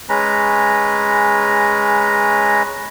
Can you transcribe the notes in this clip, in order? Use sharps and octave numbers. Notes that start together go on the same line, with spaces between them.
G#3 C#4 B4 A#5